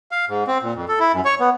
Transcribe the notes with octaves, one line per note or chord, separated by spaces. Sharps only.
F5
G#2
C4
A#2
F2
A4
E4
F#2
C#5
B3